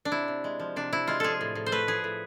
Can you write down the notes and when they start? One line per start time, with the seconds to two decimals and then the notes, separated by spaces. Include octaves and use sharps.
0.05 D4
0.12 C3 E4
0.28 C3
0.44 G#3
0.60 F3
0.76 C3 D4
0.92 C3 E4
1.07 G#3 F4
1.20 F3 G#4 A4
1.41 A2
1.55 A2
1.66 C5
1.72 A3 B4
1.87 F3 G#4
2.04 A2